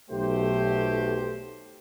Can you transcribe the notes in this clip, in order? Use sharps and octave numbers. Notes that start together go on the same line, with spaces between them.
B1 A3 G4 C5